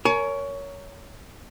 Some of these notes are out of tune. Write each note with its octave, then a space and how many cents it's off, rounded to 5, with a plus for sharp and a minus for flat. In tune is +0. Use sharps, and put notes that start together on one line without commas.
A#4 -5 C#5 +15 G#5 +30